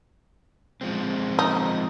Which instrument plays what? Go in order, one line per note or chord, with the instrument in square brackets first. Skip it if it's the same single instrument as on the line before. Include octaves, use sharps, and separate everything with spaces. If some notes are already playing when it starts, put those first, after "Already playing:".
[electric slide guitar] F3 G#3 C4
[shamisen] D#4